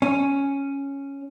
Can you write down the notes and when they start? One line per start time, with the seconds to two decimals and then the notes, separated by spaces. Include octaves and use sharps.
0.02 C#4